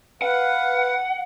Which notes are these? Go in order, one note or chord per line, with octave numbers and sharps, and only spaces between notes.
B4 F5 F#5